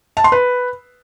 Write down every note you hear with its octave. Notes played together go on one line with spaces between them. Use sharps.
A5
C6
B4